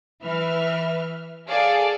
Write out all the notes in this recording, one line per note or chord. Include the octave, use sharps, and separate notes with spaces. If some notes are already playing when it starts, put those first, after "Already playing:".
E3 B4 E5 F6
G#4 A4 D5 F5